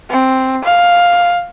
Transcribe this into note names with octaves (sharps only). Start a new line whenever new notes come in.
C4
F5